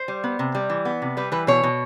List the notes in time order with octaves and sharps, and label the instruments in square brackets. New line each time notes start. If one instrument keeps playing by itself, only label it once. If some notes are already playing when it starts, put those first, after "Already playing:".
Already playing: [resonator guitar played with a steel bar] C5
G3
B3
C3
G3
E3
B3
C3
G3 B4
E3 B4
B2 C#5
B2